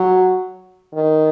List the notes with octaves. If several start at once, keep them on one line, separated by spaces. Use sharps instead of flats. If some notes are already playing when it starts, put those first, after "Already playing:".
Already playing: F#3
D#3